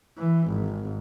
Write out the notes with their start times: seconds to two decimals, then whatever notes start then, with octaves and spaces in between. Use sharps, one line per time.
0.19 E3
0.49 G#1